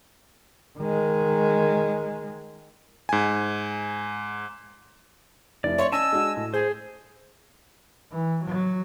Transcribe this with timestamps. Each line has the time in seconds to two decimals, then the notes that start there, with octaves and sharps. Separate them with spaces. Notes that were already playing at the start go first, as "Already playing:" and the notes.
0.79 D#3 G#3
3.09 G#2 G#5
5.64 F1 E4 D5
5.78 C#5 E5 C6 C#6
5.92 C#4 D#5 G#5 A5 E6
6.12 G#3 D4 F#4
6.37 A2
6.54 G#4 C5
8.12 E3
8.45 F#3